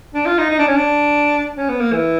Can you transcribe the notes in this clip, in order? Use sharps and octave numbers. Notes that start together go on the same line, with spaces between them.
D4
F4
D#4
D#4
D4
C#4
D4
C#4
B3
A#3
E3